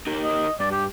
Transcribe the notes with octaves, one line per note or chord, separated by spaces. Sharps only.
D#4 G4 A#4
D#5
G2 D5
G4